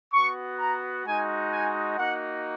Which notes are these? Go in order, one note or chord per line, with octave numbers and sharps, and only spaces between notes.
B3 F#4 C#6
A#5
G#3 D#4 F#4 G#5
G#5
A#3 D#4 F#4 F#5